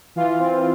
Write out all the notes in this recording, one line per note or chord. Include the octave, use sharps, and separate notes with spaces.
E3 F4
C4